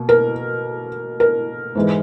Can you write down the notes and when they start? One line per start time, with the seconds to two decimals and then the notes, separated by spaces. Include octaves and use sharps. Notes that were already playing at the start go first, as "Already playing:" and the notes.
Already playing: B2 A#3
0.09 A#4
1.20 A#4
1.75 G#2 E3 G#3